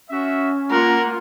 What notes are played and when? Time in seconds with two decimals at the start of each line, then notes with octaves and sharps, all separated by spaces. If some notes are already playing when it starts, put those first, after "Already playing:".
0.10 C#4 F#4 E5
0.71 A#3 F4 A#4 F#5